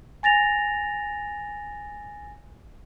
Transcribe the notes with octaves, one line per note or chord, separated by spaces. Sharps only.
G#5 A6 A#6 F7